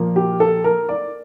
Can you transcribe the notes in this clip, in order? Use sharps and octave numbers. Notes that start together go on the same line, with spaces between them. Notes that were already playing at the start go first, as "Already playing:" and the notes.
Already playing: A#2 F3 A#3
G4
A4
A#4
D5